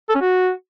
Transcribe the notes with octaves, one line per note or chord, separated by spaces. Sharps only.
A4
C#4
F#4